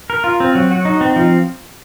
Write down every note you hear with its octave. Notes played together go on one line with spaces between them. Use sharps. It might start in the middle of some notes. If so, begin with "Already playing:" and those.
A#4
F4
C4
F#3
F#4
D#4
C4
F3